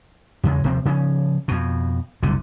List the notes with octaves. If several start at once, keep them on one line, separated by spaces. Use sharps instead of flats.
E2 C#3 G#3
D#1 C3 F3 C4
C#3 F3 G3 C#4
F2 B2
F#1 C2 A#2 D3